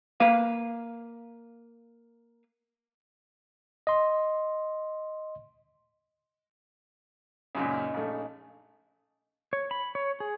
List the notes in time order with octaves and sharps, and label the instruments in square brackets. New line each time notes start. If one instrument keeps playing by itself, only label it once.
[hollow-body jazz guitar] A#3 B4 F5
[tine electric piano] D#5 C6
[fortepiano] C#2 F#2 A#2 [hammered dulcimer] C#4 D#4
[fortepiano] A#1 A3
[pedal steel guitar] C#5
B5
C#5
G#4